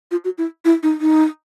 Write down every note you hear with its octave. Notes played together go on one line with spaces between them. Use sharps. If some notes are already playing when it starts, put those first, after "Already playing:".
F4
F#4
E4
E4
D#4
D#4